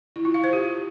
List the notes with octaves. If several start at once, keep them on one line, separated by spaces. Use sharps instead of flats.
E4
F4
F5
C5
G4